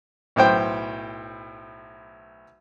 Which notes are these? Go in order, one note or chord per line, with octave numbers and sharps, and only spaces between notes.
B1 A2 C5 G5